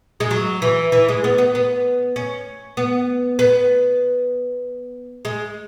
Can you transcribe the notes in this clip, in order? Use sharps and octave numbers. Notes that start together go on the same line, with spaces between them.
G#3
F#3
E3
E3
G#3
B3
B3
B3
C#4
B3
B3
G#3